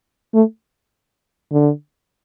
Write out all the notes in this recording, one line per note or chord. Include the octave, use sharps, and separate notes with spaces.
A3
D3